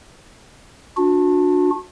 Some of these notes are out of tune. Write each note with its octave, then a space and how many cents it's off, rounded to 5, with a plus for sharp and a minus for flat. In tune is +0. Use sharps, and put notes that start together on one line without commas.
D4 +0 F#4 -35